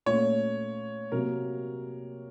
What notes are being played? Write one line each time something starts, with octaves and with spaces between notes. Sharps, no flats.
A#2 A3 C#4 C#5
C3 F#3 A#3 A#4